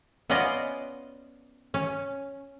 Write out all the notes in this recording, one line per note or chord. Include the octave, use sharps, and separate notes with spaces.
B3 C#4 F4 D5 D#5
C#4